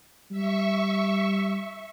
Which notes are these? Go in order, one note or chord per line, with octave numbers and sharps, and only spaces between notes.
G3 E5 C#6